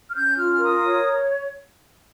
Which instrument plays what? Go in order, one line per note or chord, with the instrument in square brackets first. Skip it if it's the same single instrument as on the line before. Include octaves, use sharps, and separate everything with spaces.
[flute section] F6
C#4 G6
F4 F6
F6
A#4 D#6
C#5